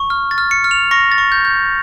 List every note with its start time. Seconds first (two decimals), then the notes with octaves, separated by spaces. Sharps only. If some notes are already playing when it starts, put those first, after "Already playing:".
Already playing: C#6
0.10 F6
0.31 A6
0.38 F6
0.51 C#7
0.64 F6
0.71 F7
0.91 C#6 A#6
1.12 A6
1.18 C#6
1.32 G6
1.45 G6